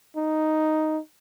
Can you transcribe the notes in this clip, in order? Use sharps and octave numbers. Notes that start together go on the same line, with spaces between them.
D#4